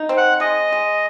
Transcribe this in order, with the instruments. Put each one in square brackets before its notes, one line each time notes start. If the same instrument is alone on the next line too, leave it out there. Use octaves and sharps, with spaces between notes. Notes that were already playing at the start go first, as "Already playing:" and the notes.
Already playing: [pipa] D#4
C4
[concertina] F#5
[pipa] G#3 [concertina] D#5
[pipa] G#3